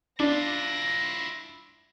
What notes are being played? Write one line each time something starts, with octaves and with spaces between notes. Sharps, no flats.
D4 E4 F4 A#6